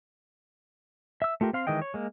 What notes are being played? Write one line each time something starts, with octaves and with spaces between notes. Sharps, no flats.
E5 E6
A3 F4 G4 A#4
C4 F5 C6
D#3 E3 G#3 D#5 G5
C#5
G#3 A#3